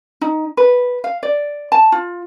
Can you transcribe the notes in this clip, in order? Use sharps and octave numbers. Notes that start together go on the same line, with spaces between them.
D#4
B4
F5
D5
A5
F4